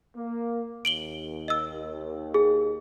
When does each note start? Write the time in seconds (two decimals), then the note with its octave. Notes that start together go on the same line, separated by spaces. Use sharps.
0.16 A#3
0.85 D#2 D7 F#7 G7
1.48 D#5 E6
2.34 G#4